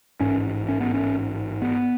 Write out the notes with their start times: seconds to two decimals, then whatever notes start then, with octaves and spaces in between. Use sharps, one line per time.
0.21 A1 G#2 C#4
0.68 C#4
0.80 B3
0.94 C#4
1.62 B3